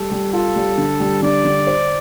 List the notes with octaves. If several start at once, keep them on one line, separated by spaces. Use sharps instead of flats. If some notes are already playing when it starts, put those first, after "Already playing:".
Already playing: G3 A4
G3
F4 A4
G3
D3
G3
D3 D5
D3
C5